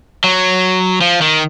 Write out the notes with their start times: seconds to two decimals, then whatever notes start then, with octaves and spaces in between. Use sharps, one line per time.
0.24 F#3
1.01 F3
1.21 D#3